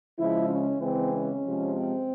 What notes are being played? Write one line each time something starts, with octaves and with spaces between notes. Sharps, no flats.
C#3 F3 G#3 E4
C#4
C#3 E3 G#3 C4
C#4
C3 F3 G#3
C4